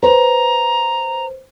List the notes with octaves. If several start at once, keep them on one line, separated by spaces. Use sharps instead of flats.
B4 C5 A#5